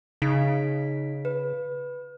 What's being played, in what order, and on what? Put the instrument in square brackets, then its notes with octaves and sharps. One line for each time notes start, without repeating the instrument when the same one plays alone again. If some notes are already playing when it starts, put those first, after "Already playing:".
[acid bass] C#3 [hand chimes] D#4 B6 D7
[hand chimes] B4